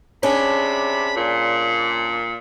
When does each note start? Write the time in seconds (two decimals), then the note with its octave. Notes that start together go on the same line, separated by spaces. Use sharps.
0.23 C3 C#4 D4 G#4 B5
1.16 A#2